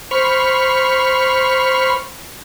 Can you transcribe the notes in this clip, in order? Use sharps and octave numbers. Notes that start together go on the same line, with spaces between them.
C5 B5 C#6 F6